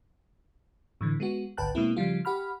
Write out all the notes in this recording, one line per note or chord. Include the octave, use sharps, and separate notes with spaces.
A2 D3 E3
G#3 B3 F#4
G#1 D2 B4 G5 A5 F#6
B2 G#3 A#3 C4 E4
C#3 F3 G3 F4
G4 F#5 B5 F6